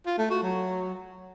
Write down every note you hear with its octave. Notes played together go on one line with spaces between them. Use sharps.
F4
A3
F#4
F#3